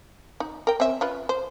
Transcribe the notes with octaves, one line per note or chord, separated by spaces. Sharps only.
D#4
A#4 G5
C4 C#4 E5
C#4 F4 B4
C5